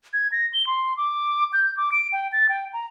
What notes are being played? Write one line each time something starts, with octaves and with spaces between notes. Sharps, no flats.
G#6
A#6
G7
C6
D6
G6
D6
D7
G5
A6
G5
A#5